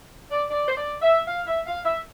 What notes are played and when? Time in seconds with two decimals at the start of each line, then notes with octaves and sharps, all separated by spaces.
0.31 D5
0.50 D5
0.68 C5
0.76 D5
1.02 E5
1.28 F5
1.47 E5
1.67 F5
1.86 E5